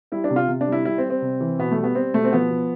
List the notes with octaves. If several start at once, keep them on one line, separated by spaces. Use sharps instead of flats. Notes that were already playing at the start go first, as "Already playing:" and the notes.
G3 E4
D4
C3
F4
C3
D4
G3
E4
G3 E4
C4
G3
C4
C3
E3
B2 B3
A3
G3
B3
G3 C4
B2 A3
C4
F3 B3
F3